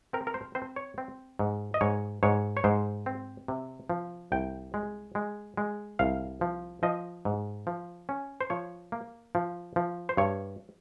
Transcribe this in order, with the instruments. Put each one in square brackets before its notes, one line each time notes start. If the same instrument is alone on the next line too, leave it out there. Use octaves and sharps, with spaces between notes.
[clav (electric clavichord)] C4 A#4
A#4
C5
C4 C5
C#5
C4
G#2
D#5
G#2 C#5
G#2 C#5
C#5
G#2 C5
C4
C3
F3
C2 G5
G#3
G#3
G#3
C2 F5
F3
F3 D#5
G#2
F3
C#4
C5
F3 C#5
A#3
F3
F3
C5
G2 C#5